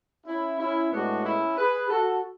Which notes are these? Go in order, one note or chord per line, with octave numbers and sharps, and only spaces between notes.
C#4 E4
C#4 E4
A2 G#3 B3 D4 F#4
C#4 E4
G#4 B4
F#4 A4